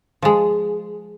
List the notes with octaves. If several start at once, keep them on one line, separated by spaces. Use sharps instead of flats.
F3 G#3